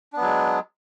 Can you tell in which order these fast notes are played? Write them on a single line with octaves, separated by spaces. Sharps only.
D4 B3 F#3 G#3